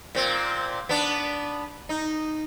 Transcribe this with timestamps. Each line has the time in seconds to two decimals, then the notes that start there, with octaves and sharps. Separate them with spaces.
0.15 A#2 C4
0.89 B3 D4
1.89 D#4